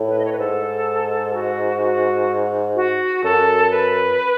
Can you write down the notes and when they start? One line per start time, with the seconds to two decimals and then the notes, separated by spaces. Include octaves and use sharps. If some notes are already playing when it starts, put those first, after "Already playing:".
Already playing: A2
0.08 B4
0.19 D#5
0.25 C#5
0.32 B4
0.39 G#2 A4
1.34 F#4
1.82 F#4
2.76 F#4
3.24 F#2 A4
3.70 B4